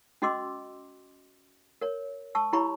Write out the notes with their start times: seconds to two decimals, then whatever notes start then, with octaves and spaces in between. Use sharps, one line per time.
0.22 C#4 F#4 D#5 C6 D6 E6
1.81 A#4 C#5
2.35 A5 C#6 E6
2.53 E4 G4 C#5 A#5 B5 C#6